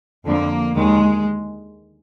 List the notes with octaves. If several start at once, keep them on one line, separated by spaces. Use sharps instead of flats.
F2 D3 A#3
D#2 D#3 G#3